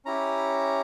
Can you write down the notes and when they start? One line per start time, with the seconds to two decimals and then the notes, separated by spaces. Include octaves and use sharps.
0.05 C#4 E4 G4 A#5